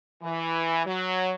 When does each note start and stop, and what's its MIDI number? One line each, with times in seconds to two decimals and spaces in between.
0.22 0.83 52
0.86 1.32 54